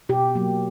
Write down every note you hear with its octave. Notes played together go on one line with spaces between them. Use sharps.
B2 G4
F#3 A#3